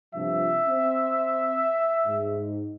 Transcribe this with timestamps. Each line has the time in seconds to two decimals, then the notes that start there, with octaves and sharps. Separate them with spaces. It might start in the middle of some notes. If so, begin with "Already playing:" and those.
0.14 G2 C3 F3 E5
0.67 C4
2.06 G#2